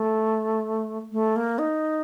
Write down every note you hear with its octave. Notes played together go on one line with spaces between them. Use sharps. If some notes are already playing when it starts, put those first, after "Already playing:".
Already playing: A3
A3
A#3
D#4